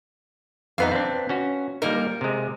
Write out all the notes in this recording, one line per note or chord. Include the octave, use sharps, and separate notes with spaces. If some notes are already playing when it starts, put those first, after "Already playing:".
F2 B3 D#4 B4 F5
C4 D4
C#4 F#4
G3 A#3 D#4 A#4
C3 G#3